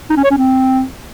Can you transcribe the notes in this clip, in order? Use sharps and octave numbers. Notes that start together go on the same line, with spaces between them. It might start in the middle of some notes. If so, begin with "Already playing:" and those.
D#4
C#4
C#5
C#4
C4